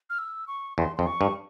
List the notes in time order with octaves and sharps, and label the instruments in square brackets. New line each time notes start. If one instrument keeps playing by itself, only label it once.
[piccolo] F6
E6
C#6
[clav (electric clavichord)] E2 [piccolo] C6
[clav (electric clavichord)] F2 [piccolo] C6
[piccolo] C#6
[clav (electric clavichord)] G2